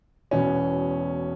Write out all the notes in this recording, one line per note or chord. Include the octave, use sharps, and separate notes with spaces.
E1 E2 B2 B3 C#4